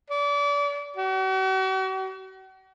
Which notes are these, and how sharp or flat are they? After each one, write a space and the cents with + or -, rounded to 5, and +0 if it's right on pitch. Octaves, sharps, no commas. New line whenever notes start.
D5 -35
F#4 +45